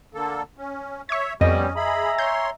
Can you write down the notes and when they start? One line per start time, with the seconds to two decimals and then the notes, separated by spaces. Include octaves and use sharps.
0.14 D3 A#3 A4
0.58 C#4
1.09 C#5 E5 C#6 G#6
1.41 F2 B2 G3 C#4 D#5
1.76 G#4 E5 G#5 A#5 B5
2.18 C#5 C6 G6